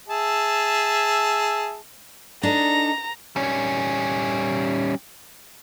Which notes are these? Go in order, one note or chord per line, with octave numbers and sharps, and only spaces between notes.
G#4 E5 A5
D4 D#4 A4 A#5
G3 C#4